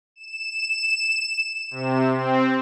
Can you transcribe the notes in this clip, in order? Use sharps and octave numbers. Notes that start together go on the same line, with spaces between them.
E7
C3
C4